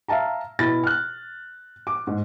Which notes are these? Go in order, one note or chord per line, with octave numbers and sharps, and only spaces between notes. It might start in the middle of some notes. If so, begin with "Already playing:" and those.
E5 F5 A5 A#5
B2 E4 B5 A6
F6 F#6
D6
G#2